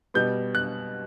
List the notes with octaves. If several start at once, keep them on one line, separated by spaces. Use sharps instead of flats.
B2 G3 B3 G6
F#6